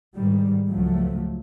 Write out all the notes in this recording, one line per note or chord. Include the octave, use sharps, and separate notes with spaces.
G#2 D#3 G3
C#2 F3 F#3 A3